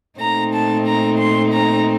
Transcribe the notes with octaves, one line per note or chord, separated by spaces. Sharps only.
A#2 A3 C4 D#4 A#5
A5
A#5
C6
A#5